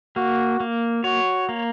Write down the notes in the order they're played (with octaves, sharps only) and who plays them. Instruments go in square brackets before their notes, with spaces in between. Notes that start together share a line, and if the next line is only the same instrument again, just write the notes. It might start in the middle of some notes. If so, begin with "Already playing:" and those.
[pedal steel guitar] A#3 [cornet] F#4
[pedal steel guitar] A#3
[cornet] F#4 [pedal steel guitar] C#5
[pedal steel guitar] A#3